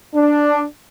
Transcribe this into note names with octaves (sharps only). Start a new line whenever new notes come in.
D4